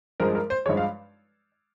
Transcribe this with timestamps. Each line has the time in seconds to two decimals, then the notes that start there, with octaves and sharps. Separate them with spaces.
0.20 G2 F3 G#3 A#4
0.35 A#4
0.50 C5
0.66 G2 F3 G#3 C#5
0.77 F5